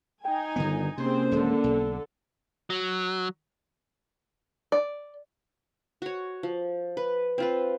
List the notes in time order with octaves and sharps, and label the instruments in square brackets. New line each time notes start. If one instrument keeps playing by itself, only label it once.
[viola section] D#4 G#5 [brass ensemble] G5
[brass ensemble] G1 [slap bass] D3 D#3 B3
[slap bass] C3 [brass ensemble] A#3 C#4 [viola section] C4 G#4 C5
[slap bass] D#1 G#3 [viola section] D3 A4
[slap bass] B1
[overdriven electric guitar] F#3
[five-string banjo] D5
[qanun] F#4 C#5
F3
B4
C4 F4 B4